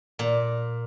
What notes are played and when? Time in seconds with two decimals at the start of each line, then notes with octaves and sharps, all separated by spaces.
0.19 A#2